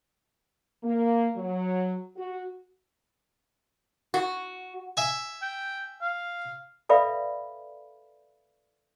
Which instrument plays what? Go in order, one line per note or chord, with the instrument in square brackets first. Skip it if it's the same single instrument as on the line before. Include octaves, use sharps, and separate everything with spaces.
[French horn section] A#3
F#3
F#4
[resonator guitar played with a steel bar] F#4
[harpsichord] E5 G#5
[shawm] G5
F5
[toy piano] A4 B4 D5 E5 F5 B5